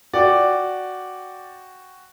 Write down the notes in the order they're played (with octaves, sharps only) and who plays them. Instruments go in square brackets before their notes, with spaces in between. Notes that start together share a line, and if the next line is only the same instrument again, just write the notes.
[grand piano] F#4 G5 [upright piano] D5